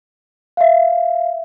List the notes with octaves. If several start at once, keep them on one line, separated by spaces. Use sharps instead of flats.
E5 F5